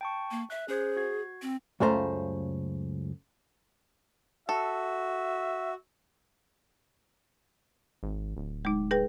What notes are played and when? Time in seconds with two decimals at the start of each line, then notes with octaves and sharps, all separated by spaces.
0.01 G5 A5 C#6
0.31 A#3
0.50 E5 F#6
0.68 C#4 G#4 C5 G#6
0.97 F#4 G#6
1.42 C4
1.80 C#2 F#2 C#3 A3 C5 A#5
4.49 F#4 A4 E5
8.03 G#1
8.37 D1
8.65 G#3 D#4
8.91 G#4 B4 G5